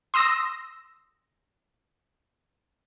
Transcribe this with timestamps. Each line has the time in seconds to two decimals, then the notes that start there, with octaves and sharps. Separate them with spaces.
0.14 C6 D#6 E6 A#6